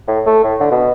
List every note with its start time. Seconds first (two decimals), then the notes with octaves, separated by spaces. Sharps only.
0.08 A2
0.27 A3
0.44 A2
0.60 D3
0.71 B2